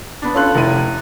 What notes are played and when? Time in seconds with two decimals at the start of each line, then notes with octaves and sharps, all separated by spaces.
0.22 B3 D4
0.34 C#4 F4 A4 C6 F#6
0.55 F1 E4 D#7